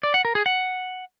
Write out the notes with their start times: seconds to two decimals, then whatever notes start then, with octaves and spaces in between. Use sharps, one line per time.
0.03 D5
0.14 F#5
0.25 A#4
0.35 G#4
0.46 F#5